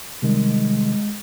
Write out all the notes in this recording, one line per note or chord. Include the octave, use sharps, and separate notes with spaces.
C3 D#3 G3 G#3